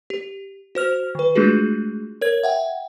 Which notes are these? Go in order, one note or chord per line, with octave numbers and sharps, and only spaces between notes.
G4
F#4 C5 F6 F7
D#3 B4
G#3 A3 D4 F4 F#4 G#4
A#4 C#5 G#6
E5 F#5 G5